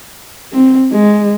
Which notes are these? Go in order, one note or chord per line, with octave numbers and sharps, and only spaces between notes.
C4
G#3